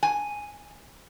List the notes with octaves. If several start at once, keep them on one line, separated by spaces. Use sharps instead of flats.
G#5